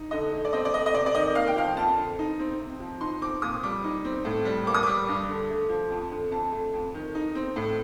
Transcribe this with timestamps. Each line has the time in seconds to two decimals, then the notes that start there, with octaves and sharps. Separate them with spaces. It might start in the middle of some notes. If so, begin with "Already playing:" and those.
Already playing: D#4
0.11 D3 D#5
0.32 A3
0.45 D5
0.53 C4 D#5
0.65 D5
0.74 A3 D#5
0.86 D#5
0.94 C3 D5
1.06 D5
1.15 D#3 D#5
1.35 A#3 F5
1.47 G5
1.56 F3 F5
1.77 F2 A5
1.97 D3
2.19 D#4
2.39 C4
2.60 C3
2.80 F3
3.01 D#4 C6
3.21 C4 D6
3.42 A#2 D#6
3.63 G3 D6
3.84 D#4
4.05 C4
4.25 A2
4.45 G3
4.67 A#3 D6
4.74 D#6
4.83 G3 D6
5.08 G2
5.28 D3
5.49 A3
5.69 F3
5.91 F2
6.11 D3
6.31 F2 A5
6.52 A3
6.74 F2
6.94 D#3
7.15 D#4
7.35 C4
7.56 A2